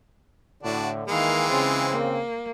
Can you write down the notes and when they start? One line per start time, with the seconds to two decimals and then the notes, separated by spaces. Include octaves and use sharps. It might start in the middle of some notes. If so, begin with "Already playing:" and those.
0.63 A2 D3 D4 F#4
1.08 D#3 E3 G#3 A#3 F5
1.50 C#3 C4 F4
1.92 A#3